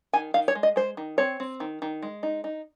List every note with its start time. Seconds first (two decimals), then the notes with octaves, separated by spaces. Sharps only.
0.13 D#3 G#5
0.34 D#3 F5
0.48 C#5
0.55 G#3
0.63 D#5
0.76 G#3 C5
0.97 D#3
1.18 C4 C#5
1.40 C4
1.60 D#3
1.82 D#3
2.02 G#3
2.23 D#4
2.44 D#4